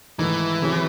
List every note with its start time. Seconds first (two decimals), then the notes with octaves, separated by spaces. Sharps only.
0.19 G#2 D#3 E3 A3 D#4
0.62 C3 D#3 F#3 C#4 G#4